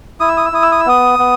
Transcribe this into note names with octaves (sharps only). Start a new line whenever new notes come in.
E4 D#6
E6
D#6
E6
E4 D#6
E6
D#6
E6
B3 D#6
B3